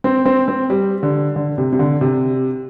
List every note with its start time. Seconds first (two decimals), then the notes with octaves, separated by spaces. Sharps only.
0.04 C4
0.25 C4
0.48 C4
0.70 G3
1.03 D3
1.36 D3
1.58 C3
1.72 C3
1.79 D3
2.01 C3